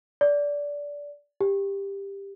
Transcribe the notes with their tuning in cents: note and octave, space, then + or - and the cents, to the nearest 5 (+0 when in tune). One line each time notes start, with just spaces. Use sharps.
D5 -20
G4 +15